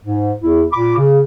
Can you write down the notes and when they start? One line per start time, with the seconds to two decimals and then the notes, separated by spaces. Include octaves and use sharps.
0.04 G#2
0.43 E2 E4
0.72 A#2 B5 D6
0.96 C#3